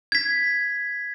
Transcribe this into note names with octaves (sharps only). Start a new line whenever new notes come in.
G#6 B6